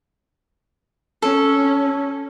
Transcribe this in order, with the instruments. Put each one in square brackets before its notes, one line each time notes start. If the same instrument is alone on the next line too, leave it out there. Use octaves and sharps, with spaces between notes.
[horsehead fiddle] C#4 [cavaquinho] A4